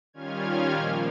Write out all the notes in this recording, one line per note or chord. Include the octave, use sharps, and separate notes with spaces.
D#3 G3 C#4 F4 F6 G#6
A#2 F3 A#3 G6 A#6